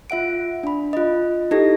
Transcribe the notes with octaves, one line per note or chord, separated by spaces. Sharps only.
F4 E5 F#5 D7
D4 B5
F4 D#5
D#4 E4 G4 A4 D#5 A#6